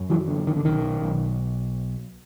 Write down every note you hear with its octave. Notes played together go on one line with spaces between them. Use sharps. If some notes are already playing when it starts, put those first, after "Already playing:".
Already playing: F#2
E3 F#3
D3
D#3
D3
B1 D#3
B1